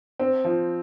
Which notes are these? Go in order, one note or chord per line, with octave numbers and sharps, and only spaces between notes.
C4
F3